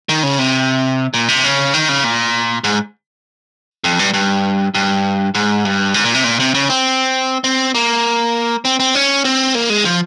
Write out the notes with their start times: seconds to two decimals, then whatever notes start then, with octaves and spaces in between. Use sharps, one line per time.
0.09 D#3
0.23 C#3
0.39 C3
1.14 A#2
1.28 C3
1.44 C#3
1.74 D#3
1.89 C#3
2.04 A#2
2.64 G#2
3.84 F2
3.99 G2
4.14 G2
4.74 G2
5.35 G#2
5.65 G2
5.94 G#2
6.04 A#2
6.14 C3
6.24 A#2
6.40 C3
6.54 C#3
6.70 C4
7.44 C4
7.75 A#3
8.65 C4
8.80 C4
8.95 C#4
9.25 C4
9.55 A#3
9.70 G#3
9.85 F3